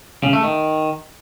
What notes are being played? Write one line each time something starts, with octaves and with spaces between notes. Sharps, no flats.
C#3
A3
D#3